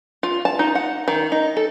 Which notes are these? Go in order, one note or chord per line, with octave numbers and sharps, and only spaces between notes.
F4
A5
D#4
F#5
D#3
D#4
A4